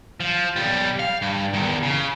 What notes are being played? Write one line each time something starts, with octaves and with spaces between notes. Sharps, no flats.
F3
B1 G3
F5
G2
E2 D#3
C#3